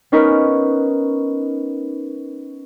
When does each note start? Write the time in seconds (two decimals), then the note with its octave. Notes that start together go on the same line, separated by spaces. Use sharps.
0.12 B3 C#4 D#4 A#4 B4 C#5